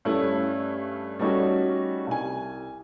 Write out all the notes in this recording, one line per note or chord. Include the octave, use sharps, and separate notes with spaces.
G2 A3 C#4 E4
G3 A3 C#4 D#4 F#4
C2 G#5